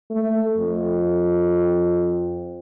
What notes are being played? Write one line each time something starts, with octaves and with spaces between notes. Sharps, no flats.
A3
F2